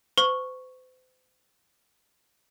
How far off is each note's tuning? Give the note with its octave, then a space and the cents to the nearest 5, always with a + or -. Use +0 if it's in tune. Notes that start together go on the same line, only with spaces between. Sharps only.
C5 -40 C#6 +0